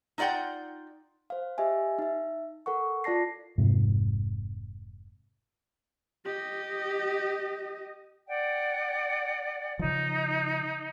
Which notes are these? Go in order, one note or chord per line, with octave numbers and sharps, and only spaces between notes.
D#4 F4 D5 F#5 G5
C5 F5
G4 D#5 E5 G#5
D#4 E5
A4 A#4 F#5 C#6
F4 D5 A5 A#6 C7
F1 G#2 C3 F3
G4 D#5
D5 F#5 G5
C#3 F3 D#4